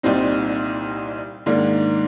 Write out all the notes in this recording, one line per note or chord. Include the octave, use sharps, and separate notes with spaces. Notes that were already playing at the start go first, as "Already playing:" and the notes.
C2 A#2 G3 C4 D#4
G#2 D#3 A#3 D4